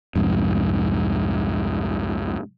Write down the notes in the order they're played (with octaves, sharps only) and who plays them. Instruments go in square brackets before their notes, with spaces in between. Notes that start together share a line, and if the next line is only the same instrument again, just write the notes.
[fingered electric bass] C2 F2 G#2